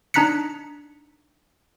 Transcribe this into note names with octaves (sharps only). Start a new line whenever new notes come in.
D4 D#4 A#5 F#6 B6 C#7